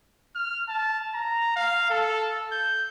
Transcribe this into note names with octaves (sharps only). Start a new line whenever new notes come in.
F6
A5
A#5
F5
A4
G6